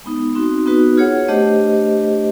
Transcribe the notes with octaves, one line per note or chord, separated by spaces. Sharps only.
G#3 B3 D#4
C4 D#4 F#4
B3 D#4 F#4 B4
F4 G#4 C#5 F#5
A3 D4 G4 C5 D#5